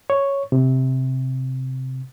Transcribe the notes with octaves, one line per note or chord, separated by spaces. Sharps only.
C#5
C3